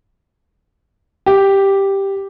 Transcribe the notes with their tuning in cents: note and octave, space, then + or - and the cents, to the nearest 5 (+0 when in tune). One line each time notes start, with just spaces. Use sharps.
G4 +0